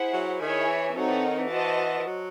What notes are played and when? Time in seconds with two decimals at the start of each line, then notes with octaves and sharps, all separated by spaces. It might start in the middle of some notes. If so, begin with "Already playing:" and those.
Already playing: E4 G#4 C5 F#5
0.13 F#3
0.40 D#3 E4 G#4 C#5 E5 G#5
0.67 E3
0.95 F#3 C4 D#4 A4 C#5 F#5
1.09 E3
1.23 D#3
1.37 E3
1.50 F#4 C5 D#5 F#5 A5
1.99 E3
2.06 F#3